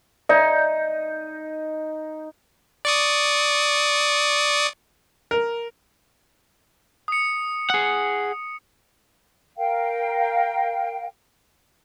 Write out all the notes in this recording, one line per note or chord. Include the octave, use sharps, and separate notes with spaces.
D#4 D5 E5
D5 C#6 D#6
A#4
D#6 C#7
G#4 F#5
A#4 F5 G5